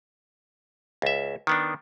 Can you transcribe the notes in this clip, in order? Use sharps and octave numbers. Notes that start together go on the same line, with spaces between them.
C#2 E5
D#3 B3 D4